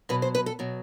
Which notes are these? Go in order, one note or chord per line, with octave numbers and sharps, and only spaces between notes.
B2 F#3 B4
C5
B4
A4
B2 F#3